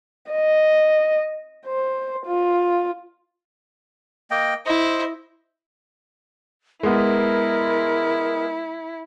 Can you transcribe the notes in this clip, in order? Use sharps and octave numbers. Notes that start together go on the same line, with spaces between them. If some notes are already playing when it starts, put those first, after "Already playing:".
D#5
C5
F4
A#3 D#5 G5
E4 C5 D#5
G#3 B3 E4 A#4